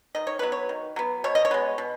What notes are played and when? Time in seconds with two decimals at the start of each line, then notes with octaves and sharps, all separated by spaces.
0.15 D#3 D#5
0.27 C#5
0.39 F#3 B3 B4
0.52 C#5
0.69 D#3
0.96 F#3 B3
1.24 B2 C#5
1.35 D#5
1.45 C#5
1.51 G#3 B3
1.78 B2